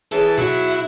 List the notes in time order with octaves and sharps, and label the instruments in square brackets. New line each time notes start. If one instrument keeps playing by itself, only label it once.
[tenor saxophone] E3 [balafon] G#4 C#5 [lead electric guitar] A4
[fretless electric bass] B2 [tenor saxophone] F#3 [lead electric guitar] E4